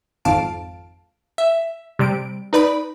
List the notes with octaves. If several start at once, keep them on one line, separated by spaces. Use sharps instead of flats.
G#1 F2 F5 A5 D7
E5
C3 G3 D7
D#4 B4 D5 B5